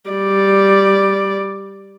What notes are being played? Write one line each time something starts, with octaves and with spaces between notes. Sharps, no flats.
G3 D5